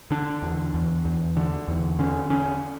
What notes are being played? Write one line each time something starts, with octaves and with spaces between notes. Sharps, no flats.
D3 D4
E2
E2
E2
D3
E2
D3 C#4
D3 C#4